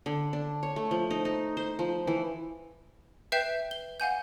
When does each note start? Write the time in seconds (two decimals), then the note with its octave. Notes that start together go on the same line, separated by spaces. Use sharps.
0.06 D3
0.33 D4
0.63 C#5
0.76 A3
0.91 F3
1.11 D#4
1.25 D#4
1.57 C5
1.79 F3
2.07 E3
3.32 B4 E5 G5 G6 C7 E7
3.71 G7
4.00 F5 F#5 G#5 G6